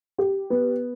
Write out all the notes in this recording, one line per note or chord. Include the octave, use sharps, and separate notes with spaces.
G4
B3